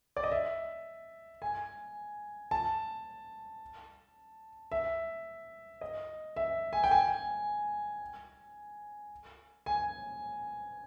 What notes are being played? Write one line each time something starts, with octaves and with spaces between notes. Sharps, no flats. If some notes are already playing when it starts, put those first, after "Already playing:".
D5
D#5
E5
G#5
A5
E5
D#5
E5
G#5
G5
G#5
G#5